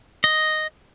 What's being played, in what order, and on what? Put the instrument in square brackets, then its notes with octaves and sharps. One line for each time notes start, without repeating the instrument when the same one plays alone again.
[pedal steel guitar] D#5